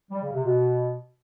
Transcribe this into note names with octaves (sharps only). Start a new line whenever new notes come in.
G3
C#3
C3
B2